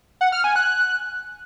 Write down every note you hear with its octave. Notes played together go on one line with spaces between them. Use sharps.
F#5
F6
G#5
F#6